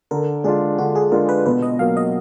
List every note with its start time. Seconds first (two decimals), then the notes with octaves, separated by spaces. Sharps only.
0.11 D3 A#4
0.44 G#3 D4 F4 G#4
0.78 D3 F#4
0.96 G#4
1.12 G#3 D4 F4 A#4
1.29 B4
1.46 B2 B4
1.62 D#5
1.79 F#3 A#3 F5
1.97 D#5